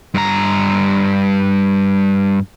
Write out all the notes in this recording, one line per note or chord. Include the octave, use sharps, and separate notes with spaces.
G2 A#5